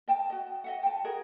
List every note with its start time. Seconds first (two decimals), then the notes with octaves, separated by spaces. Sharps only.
0.08 D#5 G5 A5
0.30 F#4 D#5
0.64 D#5 E5 F#5
0.83 G5 A5
1.04 F#4 G#4 A#4 D#5